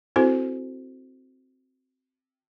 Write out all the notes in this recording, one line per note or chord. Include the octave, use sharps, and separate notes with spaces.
C4 E4 F#4 A4 C5